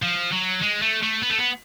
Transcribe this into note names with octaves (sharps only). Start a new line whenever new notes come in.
F3
F#3
G#3
A3
A3
B3
A3
B3